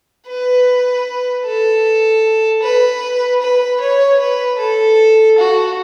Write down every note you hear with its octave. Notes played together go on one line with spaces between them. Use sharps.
B4
A4
B4
B4
C#5
B4
A4
F#4